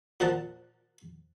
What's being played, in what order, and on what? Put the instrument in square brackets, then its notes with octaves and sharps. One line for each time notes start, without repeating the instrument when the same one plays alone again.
[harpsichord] A#2 F3 F#5 A5